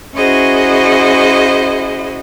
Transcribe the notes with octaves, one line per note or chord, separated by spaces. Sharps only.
C#4 E4 F#4 G#4 C5 D#5